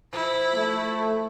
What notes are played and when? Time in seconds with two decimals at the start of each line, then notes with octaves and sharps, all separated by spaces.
0.13 F3 E4
0.53 A3